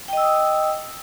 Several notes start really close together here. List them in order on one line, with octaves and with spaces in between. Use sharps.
G5 D#5 E6 D#6